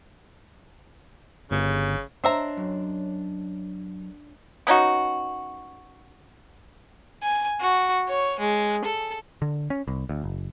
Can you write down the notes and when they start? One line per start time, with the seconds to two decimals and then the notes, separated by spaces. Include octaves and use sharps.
1.51 G1 C#3
2.24 D4 C5 C#5 D#5 E5 A#5
2.57 F#2
4.67 B3 C#4 D#4 F#4
7.23 G#5
7.61 F#4
8.09 C#5
8.40 G#3
8.84 A4
9.42 D3
9.70 C#4
9.88 C2
10.09 D2
10.24 F#1